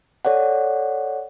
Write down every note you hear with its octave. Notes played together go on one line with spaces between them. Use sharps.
A4 C#5 D5 F#5